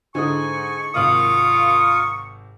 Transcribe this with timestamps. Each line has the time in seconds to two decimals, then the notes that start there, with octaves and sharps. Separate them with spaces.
0.15 G#2 D3 E4 G#5 C#6 D#6
0.95 G#1 C3 A#3 F4 F5 D#6 F#7